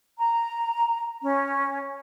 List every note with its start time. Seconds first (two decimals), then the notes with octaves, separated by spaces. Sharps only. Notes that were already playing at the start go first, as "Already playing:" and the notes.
0.17 A#5
1.21 C#4